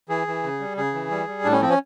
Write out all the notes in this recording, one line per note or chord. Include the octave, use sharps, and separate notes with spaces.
E3 G#4
E3
C#3
G3
C#3 G#4
E3
G3
G3
A2 D4
C#4
F3 C4
C#4